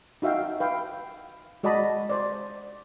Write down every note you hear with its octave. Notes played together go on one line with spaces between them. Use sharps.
D#4 F#4 E5 F5 G5
B4 F5 G5
G#3 F#4 D5 D#5 A5 B5
C5 D5